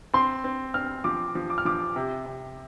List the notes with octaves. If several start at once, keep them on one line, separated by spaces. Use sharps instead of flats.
C4 C6
C4
C4 F6
F3 D6
F3
D6
F6
F3 D6
C3
C3